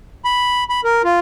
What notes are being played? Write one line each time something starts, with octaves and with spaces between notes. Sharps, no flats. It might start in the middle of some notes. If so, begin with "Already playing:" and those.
B5
B5
A#4
F4